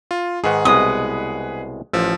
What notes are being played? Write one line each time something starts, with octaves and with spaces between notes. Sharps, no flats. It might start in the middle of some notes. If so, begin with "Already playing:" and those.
F4
G#2 D#3 G#4 B4 F#5
C2 B2 G#3 D#6
A1 F3 E6